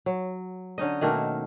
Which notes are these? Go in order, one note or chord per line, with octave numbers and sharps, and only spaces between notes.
F#3
D3 C#4 D#4 D#5
B2 D#3 A3 A#3